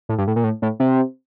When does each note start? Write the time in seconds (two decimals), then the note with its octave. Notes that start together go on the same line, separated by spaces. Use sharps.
0.09 A2
0.18 G2
0.27 A2
0.36 A#2
0.44 A2
0.62 A2
0.80 C3